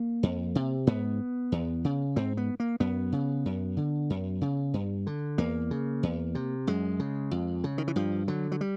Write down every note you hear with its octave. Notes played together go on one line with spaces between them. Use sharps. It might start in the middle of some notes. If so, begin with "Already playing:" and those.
Already playing: A#3
F2
C3
G#2 B3
E2
C#3
G#2 C4
B3
A#3
F#2 B3
C#3
F#2
D3
F#2
C#3
G2
D3
E2 A#3
C#3
E2
C3
F#2 G#3
C#3
F2
C#3
D#3
E3
G2 F3
D3 F#3
F#3
G3